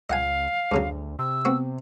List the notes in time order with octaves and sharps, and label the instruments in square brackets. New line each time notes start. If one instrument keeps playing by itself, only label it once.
[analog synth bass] C#2 [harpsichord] D#5 F#5 G#5 [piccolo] F5
[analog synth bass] D2 [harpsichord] G2 C#3 F#3
[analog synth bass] C3 [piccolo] E6
[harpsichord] B3 C4 F#4